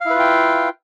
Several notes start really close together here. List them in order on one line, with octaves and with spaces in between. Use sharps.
F5 E4 B4 F4 G5